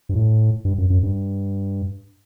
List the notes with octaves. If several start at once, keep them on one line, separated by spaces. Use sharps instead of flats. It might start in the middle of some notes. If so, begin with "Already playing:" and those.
G2
A2
G2
F#2
F#2
G2